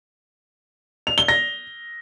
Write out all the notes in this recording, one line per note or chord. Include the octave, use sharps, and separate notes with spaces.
F7
G7
A#6